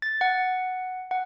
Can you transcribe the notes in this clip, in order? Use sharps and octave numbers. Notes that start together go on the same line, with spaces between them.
A6
F#5
F#5